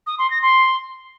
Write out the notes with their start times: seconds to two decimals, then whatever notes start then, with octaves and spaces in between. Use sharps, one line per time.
0.06 D#6
0.18 C6
0.30 A#6
0.42 C6